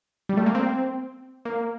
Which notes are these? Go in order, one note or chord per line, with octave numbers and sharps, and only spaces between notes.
G3
A3
A#3
C4
A#3